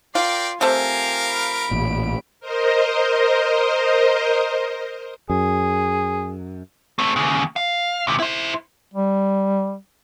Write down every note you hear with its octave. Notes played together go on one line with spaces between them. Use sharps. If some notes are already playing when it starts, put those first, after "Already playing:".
F4 A#4 D5 G5 C7
F3 A3 C4 G4 A#4 F5 G#5
B5 D7
A1 A#2
A#4 C5 D#5
F#2 G#4
A3 C4
D#2 C#3
F5
D#2 C3
E4 C5
G3